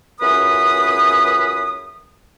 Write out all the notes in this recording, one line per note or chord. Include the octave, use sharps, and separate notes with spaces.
C#2 F#2 E3 B4 D#6